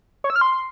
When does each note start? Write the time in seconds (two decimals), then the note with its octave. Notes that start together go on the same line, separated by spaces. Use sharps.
0.24 C#5
0.30 E6
0.36 F6
0.41 C6